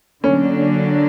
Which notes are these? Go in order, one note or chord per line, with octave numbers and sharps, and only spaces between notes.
D3 F#3 A#3 C#4 D4